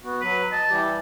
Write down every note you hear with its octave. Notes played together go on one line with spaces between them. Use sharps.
B3 F#4
F#3 B4
D#5 A5
E3 G3 G4